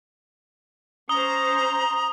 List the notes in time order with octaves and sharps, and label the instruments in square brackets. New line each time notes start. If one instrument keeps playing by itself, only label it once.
[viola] C#4 C5 [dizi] A#5 [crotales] D#6 G7